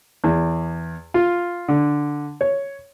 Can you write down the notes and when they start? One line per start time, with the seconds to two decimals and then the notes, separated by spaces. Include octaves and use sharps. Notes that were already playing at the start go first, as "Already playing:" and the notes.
0.24 E2
1.14 F4
1.68 D3
2.41 C#5